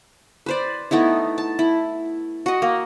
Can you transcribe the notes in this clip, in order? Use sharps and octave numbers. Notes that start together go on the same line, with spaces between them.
B4 C5 D5
A3 B3 D#4 E4
A5
E4
F#4 D#5
A#3